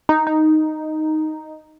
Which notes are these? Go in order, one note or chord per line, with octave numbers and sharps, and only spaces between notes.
D#4
D#4